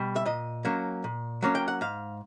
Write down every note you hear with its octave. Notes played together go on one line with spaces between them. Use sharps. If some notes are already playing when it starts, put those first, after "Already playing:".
Already playing: B2 G3
E5
A#2 D#5
F#3 A#3 C#4
A#2
F#3 A#3 C#4
G5
F#5
G#2 F5